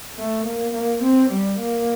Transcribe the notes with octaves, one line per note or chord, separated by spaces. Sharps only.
A3
A#3
A#3
C4
G3
A#3